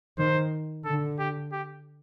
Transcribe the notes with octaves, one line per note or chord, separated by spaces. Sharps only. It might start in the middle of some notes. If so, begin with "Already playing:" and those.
D#3 C5
D3 A4
G4
G4